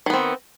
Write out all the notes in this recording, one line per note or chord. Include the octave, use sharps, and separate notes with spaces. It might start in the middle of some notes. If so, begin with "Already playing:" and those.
D#3 B3 C4